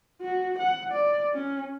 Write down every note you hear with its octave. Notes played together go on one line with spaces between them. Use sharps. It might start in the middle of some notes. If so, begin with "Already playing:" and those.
F#4
F#5
D5
C#4